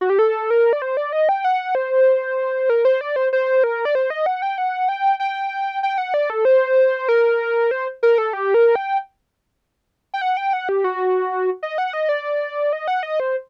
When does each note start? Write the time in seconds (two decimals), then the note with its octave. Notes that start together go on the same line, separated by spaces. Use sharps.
0.01 F#4
0.10 G4
0.19 A4
0.50 A#4
0.73 D5
0.82 C5
0.97 D5
1.13 D#5
1.29 G5
1.44 F#5
1.75 C5
2.70 A#4
2.85 C5
3.01 D5
3.16 C5
3.33 C5
3.64 A#4
3.85 D5
3.95 C5
4.10 D#5
4.26 F#5
4.42 G5
4.58 F#5
4.89 G5
5.20 G5
5.83 G5
5.98 F#5
6.14 D5
6.30 A4
6.45 C5
7.09 A#4
7.71 C5
8.03 A#4
8.18 A4
8.33 G4
8.54 A#4
8.75 G5
10.14 G5
10.21 F#5
10.37 G5
10.53 F#5
10.69 G4
10.84 F#4
11.63 D#5
11.78 F#5
11.93 D#5
12.09 D5
12.73 D#5
12.88 F#5
13.03 D#5
13.20 C5